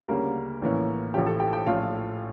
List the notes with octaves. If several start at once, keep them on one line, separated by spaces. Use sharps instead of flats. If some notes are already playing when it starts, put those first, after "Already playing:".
D2 C#3 G3 A#3 C#4 A#4
A#1 A2 E3 A#3 C#4
A1 A2 F3 A3 C#4 G4 G5
A4 A5
G4 G5
G4 G5
A#1 A2 F3 A3 C#4 F4 F5